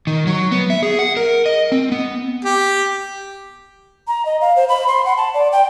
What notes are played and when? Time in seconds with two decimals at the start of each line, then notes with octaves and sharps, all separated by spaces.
0.07 D#3
0.27 F#3
0.52 B3
0.70 E5
0.83 G#4
0.99 F#5
1.17 A#4
1.46 D#5
1.72 C4
1.92 B3
2.45 G4
4.08 A#5
4.26 D#5
4.41 F5
4.56 C5
4.69 B5
4.88 C6
5.05 F#5
5.17 A5
5.34 D5
5.52 G5